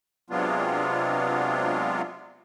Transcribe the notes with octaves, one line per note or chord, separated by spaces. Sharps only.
C3 F#3 G#3 B3 D4 F4